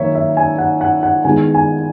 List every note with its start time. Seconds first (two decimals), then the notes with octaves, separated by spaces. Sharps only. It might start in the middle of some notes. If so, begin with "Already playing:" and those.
Already playing: D#3 F#3 A#3 C#5 E5
0.15 E5
0.37 G#5
0.58 F#5
0.81 F#5
1.03 F#5
1.25 D#3 G#3 B3 E4 G#5
1.54 G#5